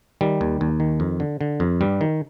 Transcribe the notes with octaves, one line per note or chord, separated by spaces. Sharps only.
D#3 G3
D#2
D#2
D#3
F2
D3
D3
F2
G2 G3
D#3